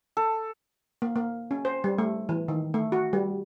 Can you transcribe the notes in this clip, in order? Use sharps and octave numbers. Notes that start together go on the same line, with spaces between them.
A4
A#3
A#3
C#4
C5
G3
A3
E3
D#3
A3
F#4
G3